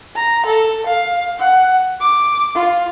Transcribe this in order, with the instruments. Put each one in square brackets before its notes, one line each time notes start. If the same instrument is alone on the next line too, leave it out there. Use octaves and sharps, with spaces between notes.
[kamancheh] A#5
A4
F5
F#5
D6
F4